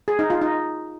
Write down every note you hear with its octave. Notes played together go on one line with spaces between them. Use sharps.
G#4
D#4
F4
D#4